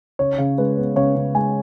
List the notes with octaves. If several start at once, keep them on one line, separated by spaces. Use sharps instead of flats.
C#3 C#5
C#3
G#3 B4
B3
C#3 C#5
C#3
G#3 G#5